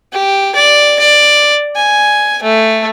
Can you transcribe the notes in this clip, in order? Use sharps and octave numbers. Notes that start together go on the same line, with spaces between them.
G4
D5
D5
G#5
A3